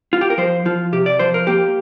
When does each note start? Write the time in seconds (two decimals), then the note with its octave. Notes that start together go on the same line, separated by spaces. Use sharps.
0.13 F4
0.21 G4
0.30 A#4
0.38 F3 C5
0.65 F3 F4
0.92 C3 G4
1.06 D5
1.19 F3 C5
1.34 A#4
1.47 A#3 G4